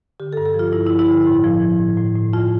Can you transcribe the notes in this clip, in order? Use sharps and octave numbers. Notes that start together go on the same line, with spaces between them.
D3 G4
A4
G2
A4
F3
F4
G2 E4
E4
F3
E4
D3
A2
F3
F3
A2
A2
A2
F2 F4